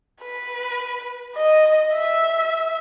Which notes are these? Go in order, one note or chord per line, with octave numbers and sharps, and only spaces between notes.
B4
D#5
E5